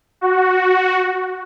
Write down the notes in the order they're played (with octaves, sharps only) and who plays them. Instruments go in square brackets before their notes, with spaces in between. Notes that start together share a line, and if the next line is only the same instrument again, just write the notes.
[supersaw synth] F#4